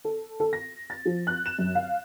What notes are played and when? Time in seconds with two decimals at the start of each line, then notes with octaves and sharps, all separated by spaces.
0.05 A4
0.40 A4
0.53 A#6
0.90 A6
1.05 F3
1.27 F#6
1.46 E7
1.59 F#2
1.75 F5